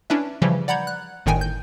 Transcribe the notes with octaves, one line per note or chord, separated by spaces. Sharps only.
C#4 D4 E4 B4 E5
C#3 E3 F3 G3
D5 F#5 A#5 B5 G6 G#6
F#6
G1 A2 D#3 G5 G#5
G6